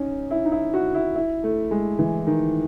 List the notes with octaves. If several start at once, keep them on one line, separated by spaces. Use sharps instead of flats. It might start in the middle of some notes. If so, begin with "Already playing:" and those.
Already playing: C#4 D#4
E4
D#4
E4
F#4
E4
E4
A3
G#3
E3
D#3